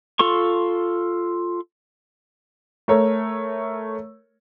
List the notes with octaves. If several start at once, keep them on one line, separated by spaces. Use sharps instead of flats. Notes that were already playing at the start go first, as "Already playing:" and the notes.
F4 A4 C6 C#6
A3 A#4 C#5